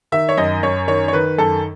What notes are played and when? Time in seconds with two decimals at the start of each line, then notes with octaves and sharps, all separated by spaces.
0.12 D#3 E5
0.29 C#5
0.37 F#2 D#5
0.63 F#2 C#5
0.88 D#3 C#5
1.08 C#5
1.13 D#3 B4
1.38 F#2 A4